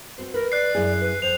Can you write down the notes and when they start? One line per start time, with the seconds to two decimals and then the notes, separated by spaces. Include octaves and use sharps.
0.18 C4 F#4 C5
0.34 A#4 B4
0.52 D5 F#6 C7
0.75 F#2 E4 G#4
1.01 B4
1.22 F2 C5 F7